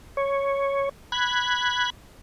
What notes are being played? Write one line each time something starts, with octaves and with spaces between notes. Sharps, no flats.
C#5
B5 F#6 G#6